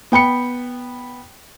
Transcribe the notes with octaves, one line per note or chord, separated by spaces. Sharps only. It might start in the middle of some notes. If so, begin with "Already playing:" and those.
B3 G5 B5 C#7